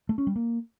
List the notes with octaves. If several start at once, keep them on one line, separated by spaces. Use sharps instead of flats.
A3
C#4
G3
A#3